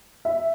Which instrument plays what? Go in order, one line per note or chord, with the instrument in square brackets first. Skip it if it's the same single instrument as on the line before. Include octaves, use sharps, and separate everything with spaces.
[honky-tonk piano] E5